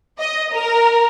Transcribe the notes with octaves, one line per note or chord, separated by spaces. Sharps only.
D#5
A#4